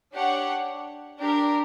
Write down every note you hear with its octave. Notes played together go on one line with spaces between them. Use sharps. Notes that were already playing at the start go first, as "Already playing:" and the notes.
D4 G4 C#5 F#5
D4 G4 A#4